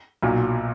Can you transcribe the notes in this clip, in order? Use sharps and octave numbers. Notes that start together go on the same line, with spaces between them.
B1 A#2 F#3